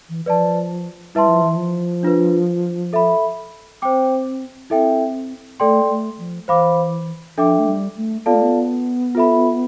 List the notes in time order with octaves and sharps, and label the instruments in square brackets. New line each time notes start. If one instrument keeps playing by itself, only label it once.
[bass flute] E3
[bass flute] F3 [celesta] B4 D5 A5
[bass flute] G3 [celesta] E4 B4 E5 A5 C6
[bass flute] F3
E3
F3
[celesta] D4 F4 B4
A4 E5 B5
[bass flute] C4 [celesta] C5 G5 D6
[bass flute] C4 [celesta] E4 A4 E5 G5
[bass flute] A3 [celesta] A4 D5 G5 C6
[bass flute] A3
F3
[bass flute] E3 [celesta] C5 F5 B5 D6
[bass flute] F3 [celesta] D4 A4 E5 G5 D6
[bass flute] A3
G3
A3
[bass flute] B3 [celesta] F4 A4 D5 F5 A5
[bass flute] A3
B3
[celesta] F4 A4 E5 B5